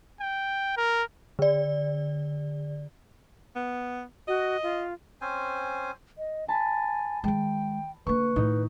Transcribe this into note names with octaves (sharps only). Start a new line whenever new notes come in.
G5
A#4
D3 D5
B3
F#4 D#5
F4
C4 C#4 C5 G#5
D#5
G#5 A5 B5
D#3 G#3 G5
D3 A#3 B4 C#6
A2 D#3 D#4